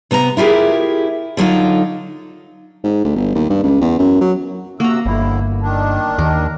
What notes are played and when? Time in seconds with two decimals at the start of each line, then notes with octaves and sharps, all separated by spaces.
0.11 C3 B3 A5 A#5
0.37 E4 F4 G4 G#4 A#4
1.37 D3 F#3 D#4 F4
2.84 G#2
3.05 D2
3.16 G1
3.35 D#2
3.50 G2
3.64 C#2
3.81 E2
3.99 F#2
4.21 F#3
4.80 C3 A#3 F#4 A#5 E6
5.06 G1 D#2 D3 E4
5.62 D#3 D4
6.18 D#2 A#4